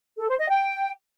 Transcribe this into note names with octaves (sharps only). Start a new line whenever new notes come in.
A4
C5
D#5
G5